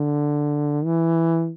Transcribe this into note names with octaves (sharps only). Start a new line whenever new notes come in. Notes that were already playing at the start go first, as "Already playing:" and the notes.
Already playing: D3
E3